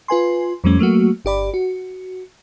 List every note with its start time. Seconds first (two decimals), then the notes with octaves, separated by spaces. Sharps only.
0.08 F4 B4 G#5 C6
0.64 F2 F3 G3 A3 C#4
0.79 F#3 A3 A#3 F#4
1.25 G1 G4 D5 B5
1.54 F#4